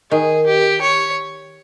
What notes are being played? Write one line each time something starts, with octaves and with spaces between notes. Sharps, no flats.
D#3 G#4
G4
C#5